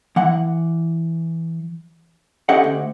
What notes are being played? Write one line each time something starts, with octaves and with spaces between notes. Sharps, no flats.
E3 F#5
C#4 G4 A4 D#5 E5 F#5
D2